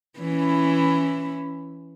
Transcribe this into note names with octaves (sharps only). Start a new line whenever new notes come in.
E3 C#4 E4